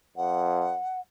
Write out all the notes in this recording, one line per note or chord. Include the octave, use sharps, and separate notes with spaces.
F2 F#5